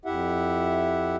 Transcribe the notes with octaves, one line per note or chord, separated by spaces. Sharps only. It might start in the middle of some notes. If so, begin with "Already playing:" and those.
F2 E4 G4 E5 F#5